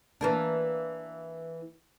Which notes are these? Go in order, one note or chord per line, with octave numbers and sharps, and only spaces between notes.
E3 A#3 D4